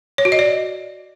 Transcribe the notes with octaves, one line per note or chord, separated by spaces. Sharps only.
C#5
F#4
D#5
D5